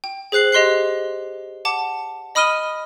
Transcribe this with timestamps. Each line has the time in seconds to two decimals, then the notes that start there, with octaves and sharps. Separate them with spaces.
0.04 G5
0.32 G#4 C5 F#6 C7 F#7
0.52 G4 D#5 C6 F#6 C7
1.65 F#5 A5 D6
2.35 D#5 B5 D#6 F6 D#7 G7